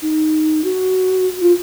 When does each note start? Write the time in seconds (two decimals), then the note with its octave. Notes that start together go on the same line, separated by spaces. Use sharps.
0.02 D#4
0.64 F#4
1.41 F4